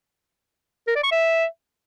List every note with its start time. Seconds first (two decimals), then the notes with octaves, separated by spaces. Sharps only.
0.87 A#4
0.95 D5
1.04 C#6
1.12 E5